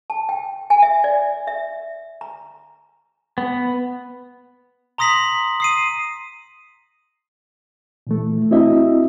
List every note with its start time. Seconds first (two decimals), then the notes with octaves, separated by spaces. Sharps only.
0.10 A5
0.29 G5
0.70 G#5
0.82 E5
1.04 D5
1.47 E5
2.21 A#5
3.38 B3
4.98 A#5 C6 D#6 A#6 B6 F#7
5.60 D#6 C7 D#7
8.07 A#2 E3 A3
8.51 C4 D4 E4 F#4 D#5 E5